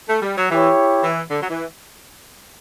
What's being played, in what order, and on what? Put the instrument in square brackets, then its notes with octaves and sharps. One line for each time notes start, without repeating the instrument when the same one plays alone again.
[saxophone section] A3
G3
F#3
[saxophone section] E3 [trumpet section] E4 G4 C#5
[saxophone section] E3
D3
F#3
E3